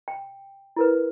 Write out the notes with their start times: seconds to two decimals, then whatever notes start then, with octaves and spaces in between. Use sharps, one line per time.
0.08 G5
0.76 E4 A#4 B4